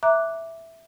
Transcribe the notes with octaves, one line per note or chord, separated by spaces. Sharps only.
E5 A#5 D6 F#6